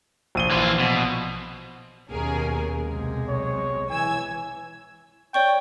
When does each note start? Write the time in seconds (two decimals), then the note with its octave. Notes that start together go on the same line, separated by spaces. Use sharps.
0.35 A#1 D#7 G7
0.50 E3 F4
0.80 B2
2.10 D#2 B2 C#4 G#4 A#4
2.86 B1 C3 G#3
3.28 C#5
3.90 E3 G#5 E6 G#6
5.34 C#5 D5 G5 C#6